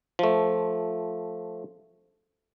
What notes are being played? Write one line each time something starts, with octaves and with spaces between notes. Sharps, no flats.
F3 A3